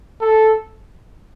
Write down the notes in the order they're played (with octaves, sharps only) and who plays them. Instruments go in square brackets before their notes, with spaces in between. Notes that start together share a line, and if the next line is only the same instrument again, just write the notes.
[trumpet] A4